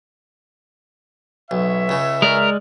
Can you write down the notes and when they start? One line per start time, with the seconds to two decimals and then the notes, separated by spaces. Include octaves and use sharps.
1.51 B1 B4 C#5 E5
1.89 C#2 C#3
2.22 G#3 A#4 D5 F6